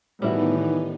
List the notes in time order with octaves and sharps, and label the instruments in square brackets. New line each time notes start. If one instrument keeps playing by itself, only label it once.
[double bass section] A2 [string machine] D#3 B3 D#4 [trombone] E3 [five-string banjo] G3 E4 F#4